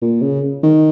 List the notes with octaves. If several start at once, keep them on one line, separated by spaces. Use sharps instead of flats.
A#2
C#3
D#3